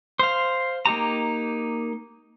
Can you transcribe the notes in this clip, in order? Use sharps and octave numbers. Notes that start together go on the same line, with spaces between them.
C5 F5
A#3 D#4 G4 A#5